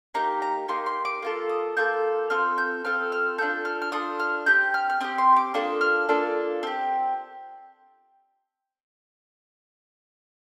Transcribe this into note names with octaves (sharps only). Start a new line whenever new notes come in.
A#3 D#4 G4 A#5
A#5
A#3 D#4 G4 C6
C6
D6
A#3 F4 A4
D#6
A#3 F4 A4 G6
C4 F4 A4 F6
G6
C4 F4 A4 F6
F6
D4 F4 A4 G6
F6
F6
D4 F4 A4 D#6
F6
C4 G4 G6
F6
F6
C4 G4 D#6
C6
D6
A#3 D4 F4 A4 D#6
F6
A#3 D4 F4 A4
C4 G4